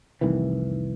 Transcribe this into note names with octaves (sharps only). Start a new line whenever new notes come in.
F1 C2 D#3 E3